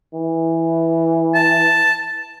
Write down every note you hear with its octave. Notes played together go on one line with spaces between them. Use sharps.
E3
A5